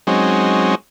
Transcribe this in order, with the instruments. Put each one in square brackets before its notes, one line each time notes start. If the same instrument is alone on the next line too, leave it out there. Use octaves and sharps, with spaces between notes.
[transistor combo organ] F#3 G#3 C4 C#4 D#4